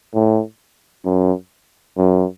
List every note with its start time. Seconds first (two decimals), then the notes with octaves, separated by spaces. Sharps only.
0.14 A2
1.05 F#2
1.97 F#2